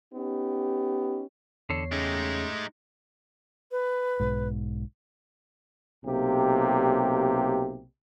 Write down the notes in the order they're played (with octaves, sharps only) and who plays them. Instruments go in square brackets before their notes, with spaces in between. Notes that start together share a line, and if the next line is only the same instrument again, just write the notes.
[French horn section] B3 C#4 D#4 G4
[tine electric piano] E2 C#5 C7 [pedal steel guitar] D3 A4
[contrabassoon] C#3 [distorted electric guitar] G#3 D#4 [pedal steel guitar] A3 G4
[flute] B4
[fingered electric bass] B1 G#2
[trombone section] B1 C3 A#3 G4